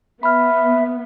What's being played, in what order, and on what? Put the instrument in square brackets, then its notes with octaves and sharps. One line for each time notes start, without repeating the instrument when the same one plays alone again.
[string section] B3 [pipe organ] E5 [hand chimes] B5 F6